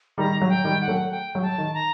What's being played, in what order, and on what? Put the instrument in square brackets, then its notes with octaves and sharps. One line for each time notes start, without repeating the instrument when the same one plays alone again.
[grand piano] D#3 G3 [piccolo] A#5
[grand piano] F#3
[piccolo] G5
[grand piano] D#3 G3
[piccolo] F#5
[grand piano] F#3 A3
[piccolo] G5
[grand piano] F#3
[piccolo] A5
[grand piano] D#3
[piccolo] A#5